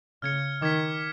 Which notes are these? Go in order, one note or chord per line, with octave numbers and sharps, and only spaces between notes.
C#3 F6 G#6 C#7
D#3 D6 F6 G#6 B6